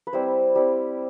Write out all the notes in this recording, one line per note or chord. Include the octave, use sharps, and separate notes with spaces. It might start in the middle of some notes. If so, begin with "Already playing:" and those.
B4
G3 C4 E4 C5
G3 C4 E4